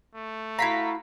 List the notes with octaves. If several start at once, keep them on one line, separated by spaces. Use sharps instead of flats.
A3
E4 F#4 F5 A#5 B6